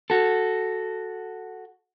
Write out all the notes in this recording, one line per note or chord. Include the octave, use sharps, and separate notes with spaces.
F#4 A4